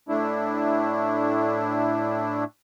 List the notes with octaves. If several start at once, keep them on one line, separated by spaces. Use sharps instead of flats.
A2 A3 D4 E4